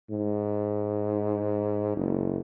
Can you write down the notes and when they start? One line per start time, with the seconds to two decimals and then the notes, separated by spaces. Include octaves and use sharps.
0.10 G#2
1.96 F#1